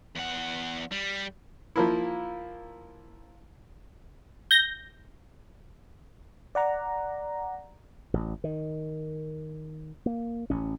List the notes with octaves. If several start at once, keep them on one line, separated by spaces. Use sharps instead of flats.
E2 F#5
G3
F3 A#3 E4
G6 A#6
D5 F#5 A#5
A1
D#3
A#3
A1 C#4